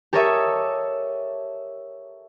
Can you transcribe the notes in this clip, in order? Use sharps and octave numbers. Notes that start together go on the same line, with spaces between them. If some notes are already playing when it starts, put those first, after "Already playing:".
G4 A4 A#4 C#5 D#5 E5